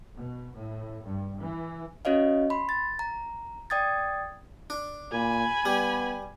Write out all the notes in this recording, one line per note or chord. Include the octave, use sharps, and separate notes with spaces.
B2
A2
G2
E3
C#4 F#4 C#5 D#5 F5
B5 C6
A6
A#5
D5 G5 D#6 G#6 A6
D4
A#2 G#5 B5
G3 B3